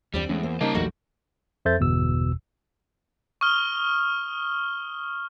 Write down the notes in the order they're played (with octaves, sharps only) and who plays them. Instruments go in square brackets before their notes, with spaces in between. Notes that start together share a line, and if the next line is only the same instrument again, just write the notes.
[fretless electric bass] D#2 [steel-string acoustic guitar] D3 C4 D5 [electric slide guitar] G3
[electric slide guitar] E2 [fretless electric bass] G#3 A3 C#4
[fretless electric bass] A#3 [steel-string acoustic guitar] C5
[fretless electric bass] C#3 G3 C#4 [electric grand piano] A#3 D#4 [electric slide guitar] D#5 A5 A#5
[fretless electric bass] A#1 F#3 A3 [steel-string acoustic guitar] E2 D3 G3 [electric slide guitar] F#4
[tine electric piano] F2 A4 C5 E5 G6 A6
G1 E2 B2 E6
[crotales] C#6 D#6 F6 G7